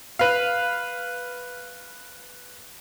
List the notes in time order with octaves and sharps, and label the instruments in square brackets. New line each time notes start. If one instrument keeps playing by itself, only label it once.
[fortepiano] B4 F5